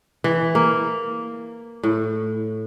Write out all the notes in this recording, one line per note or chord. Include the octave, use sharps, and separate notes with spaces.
E3
A#3
A2